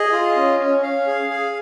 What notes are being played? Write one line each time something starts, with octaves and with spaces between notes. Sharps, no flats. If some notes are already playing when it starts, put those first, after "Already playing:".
Already playing: G#4 D#5
F4
C#4
C#4
C#4 F5
G#4
G#4